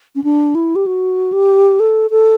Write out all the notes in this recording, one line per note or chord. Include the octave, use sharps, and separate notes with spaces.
C#4
D4
E4
G4
F#4
G4
A4
A4